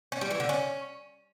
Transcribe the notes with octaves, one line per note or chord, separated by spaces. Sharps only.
C#4
G3
E3
D3
C#4